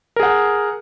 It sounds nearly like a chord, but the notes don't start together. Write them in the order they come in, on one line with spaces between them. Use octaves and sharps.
A#4 G#4 F#5